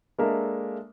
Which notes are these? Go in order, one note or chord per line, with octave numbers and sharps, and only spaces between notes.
G#3 A#3 D4 A4 A#4 E5